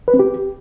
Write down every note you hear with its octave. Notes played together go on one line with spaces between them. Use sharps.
B4
C4
G4